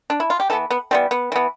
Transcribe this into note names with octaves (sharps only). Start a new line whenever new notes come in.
D4
E4
F4
G4
E3 B3 A4
B3
E3 G3 B3 C4
B3
E3 B3